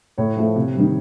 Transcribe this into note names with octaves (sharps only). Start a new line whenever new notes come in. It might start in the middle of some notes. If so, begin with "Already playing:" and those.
A2 C#5
F3 A3
C3
D#3 G3